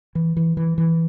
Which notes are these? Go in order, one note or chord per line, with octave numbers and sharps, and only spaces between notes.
E3
E3
E3
E3